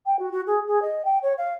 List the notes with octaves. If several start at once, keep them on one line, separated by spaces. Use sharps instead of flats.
G5
F#4
F#4
G#4
G#4
D#5
G5
C#5
F5